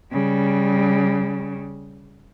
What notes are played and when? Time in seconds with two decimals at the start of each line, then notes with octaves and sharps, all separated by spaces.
0.12 C#3 G3